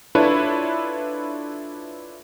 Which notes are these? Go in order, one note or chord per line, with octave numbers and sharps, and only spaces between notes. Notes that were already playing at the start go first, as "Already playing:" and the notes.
D4 E4 F4 A4 B4 C#5